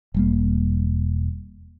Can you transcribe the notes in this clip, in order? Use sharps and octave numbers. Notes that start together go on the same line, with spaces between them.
E1 G3 A#3